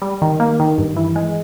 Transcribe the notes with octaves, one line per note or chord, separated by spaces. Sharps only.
G3
D#3
A#3
D#3
G2
E3
G#3